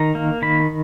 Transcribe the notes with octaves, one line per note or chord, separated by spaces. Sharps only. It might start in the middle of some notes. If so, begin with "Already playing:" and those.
Already playing: D#3 A#5
A#3
D#3 B5